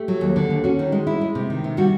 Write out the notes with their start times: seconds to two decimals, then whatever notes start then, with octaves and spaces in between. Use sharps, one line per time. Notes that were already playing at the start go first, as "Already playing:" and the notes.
Already playing: A3 G4
0.08 F#3
0.21 D#2
0.36 D3
0.50 D#2
0.64 C#4 F#4
0.79 D#3
0.92 G#3
1.07 E4
1.21 G#3
1.35 C3
1.50 D#3
1.64 C3
1.77 G3 F#4